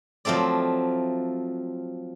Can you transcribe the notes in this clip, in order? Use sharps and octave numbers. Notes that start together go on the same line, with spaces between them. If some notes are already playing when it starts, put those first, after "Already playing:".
F3 F#3 A3 C4 D5